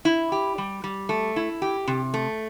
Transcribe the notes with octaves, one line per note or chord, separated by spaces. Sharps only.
E4
G4
G3
G3
A3
E4
G4
C3
A3